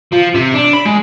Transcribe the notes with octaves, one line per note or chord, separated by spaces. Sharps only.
F3
C3
D4
B5
G#3